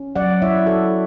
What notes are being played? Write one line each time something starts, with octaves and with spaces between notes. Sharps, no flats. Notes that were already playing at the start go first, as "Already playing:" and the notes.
Already playing: C#4
F#3 D5 F#5
E4 C#5 E5
E4 F#4 A4